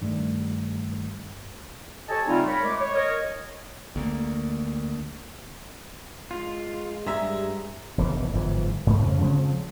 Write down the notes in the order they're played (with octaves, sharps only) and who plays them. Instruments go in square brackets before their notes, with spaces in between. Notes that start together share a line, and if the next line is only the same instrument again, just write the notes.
[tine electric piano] G2 D#3 G3 A3
[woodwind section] G4 A4 C#5 D#5 G#5 A5
C#3 G3 A3 C4 D#4 F4
A#4 C#5 B5
G#3 A3 D6
C#5
A#4 C#5 D#5
[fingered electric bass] D2 A#3
[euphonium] G#3 [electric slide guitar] F4
[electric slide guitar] G2 G#3 [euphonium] G4 [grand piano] E5 A#5
[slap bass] E1 A#1 C#3 E3
G1 G#2 E3 F3
G#2 F3 A3
F2 C#3 C4 C#4
C#3 F3 G#3 C4